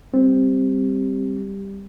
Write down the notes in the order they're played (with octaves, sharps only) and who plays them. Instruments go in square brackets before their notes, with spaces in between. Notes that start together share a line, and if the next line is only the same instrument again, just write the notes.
[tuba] G3 [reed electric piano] C4